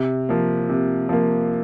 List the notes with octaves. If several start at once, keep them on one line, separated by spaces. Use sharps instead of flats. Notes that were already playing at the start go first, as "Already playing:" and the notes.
Already playing: C3
F3 A#3
C3
F3 A#3